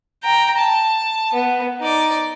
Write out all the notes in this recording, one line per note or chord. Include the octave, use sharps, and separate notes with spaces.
G5 A#5
A5
B3
D#4 D5